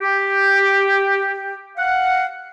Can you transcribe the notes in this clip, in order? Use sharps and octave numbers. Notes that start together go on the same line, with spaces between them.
G4
F5 F#5